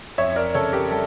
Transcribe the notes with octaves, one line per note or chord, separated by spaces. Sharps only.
F2 C#5 E5
A#4 D5
C#3 A4 C#5
G4 A#4
G3 A4